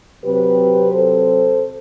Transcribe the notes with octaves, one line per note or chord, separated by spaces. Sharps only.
C3 F#3 C4 G4 B4
A4 C5